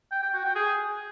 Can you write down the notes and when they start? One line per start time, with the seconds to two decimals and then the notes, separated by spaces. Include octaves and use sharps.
0.11 G5
0.22 G5
0.33 F#4
0.44 G5
0.55 G#4